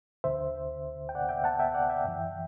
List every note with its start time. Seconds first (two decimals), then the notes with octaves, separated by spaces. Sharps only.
0.24 D2 D3 C5 E5
1.09 G5
1.15 D5 F#5
1.29 E5 G5
1.44 F#5 A5
1.59 E5 G5
1.74 D5 F#5
1.89 E5 G5
2.04 F#2 E3